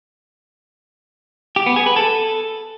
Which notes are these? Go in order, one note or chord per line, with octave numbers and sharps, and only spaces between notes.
G4
B3
G#4
B4
A4